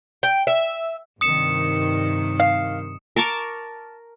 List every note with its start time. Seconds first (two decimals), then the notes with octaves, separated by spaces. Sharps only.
0.23 G5
0.47 E5
1.21 G2 C3 D#3 D#6 C#7 E7
2.40 F5
3.16 A#4 A5 C#6 D6